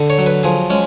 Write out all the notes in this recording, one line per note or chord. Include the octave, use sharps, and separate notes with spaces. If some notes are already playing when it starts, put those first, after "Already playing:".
Already playing: D3
C#5
F#3
B4
F3 G#4
G#3 C#4